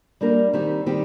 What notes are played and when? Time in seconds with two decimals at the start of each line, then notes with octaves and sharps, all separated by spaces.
0.21 G3 A#3 D4 G4 A#4
0.53 D#3 G3 C4 G4
0.86 D#3 G3 C4 G4